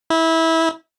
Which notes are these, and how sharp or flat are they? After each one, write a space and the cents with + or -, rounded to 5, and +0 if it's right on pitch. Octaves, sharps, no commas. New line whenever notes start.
E4 -20